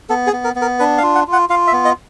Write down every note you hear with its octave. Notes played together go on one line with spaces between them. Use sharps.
B3 A4
G#4
B3
A#4
B3
A#4
D4 B4
F5
F4
F#5
F4
F#5
F4 F5
E5
B3
D#5